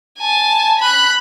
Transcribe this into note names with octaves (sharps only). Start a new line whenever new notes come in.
G#5 A5
B5 F#6